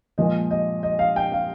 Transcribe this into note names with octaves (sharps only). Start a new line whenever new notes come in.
A#2 F3 G#3 D#5
D#5
D#5
F5
G5
F5